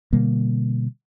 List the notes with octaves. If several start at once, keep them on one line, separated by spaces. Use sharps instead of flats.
B2 D3 G3 A#3